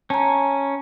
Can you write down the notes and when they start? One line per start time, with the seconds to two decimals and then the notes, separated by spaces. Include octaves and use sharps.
0.10 C#4 A5 A#5